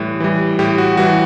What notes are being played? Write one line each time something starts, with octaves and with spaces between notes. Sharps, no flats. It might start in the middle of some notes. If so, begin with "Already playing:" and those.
Already playing: A2 E3 G3
E3 G3
A2 G4
F#4
E3 G3 F#4